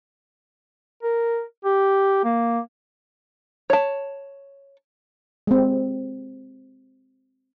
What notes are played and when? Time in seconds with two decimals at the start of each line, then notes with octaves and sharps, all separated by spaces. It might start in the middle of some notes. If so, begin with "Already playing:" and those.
1.03 A#4
1.64 G4
2.24 A#3
3.70 C#5 A5
5.47 G#3 C4